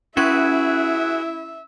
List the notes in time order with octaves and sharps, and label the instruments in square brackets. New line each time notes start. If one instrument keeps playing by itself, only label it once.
[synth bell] C#4 C#6 G#6 [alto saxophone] E4 [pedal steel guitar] F#4 G#4 B4 [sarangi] E5